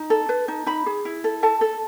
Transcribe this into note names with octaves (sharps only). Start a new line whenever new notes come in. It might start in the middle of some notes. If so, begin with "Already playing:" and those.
Already playing: D#4
A4
B4
D#4
D#4 B5
G#4
E4
A4
A4 A5
A4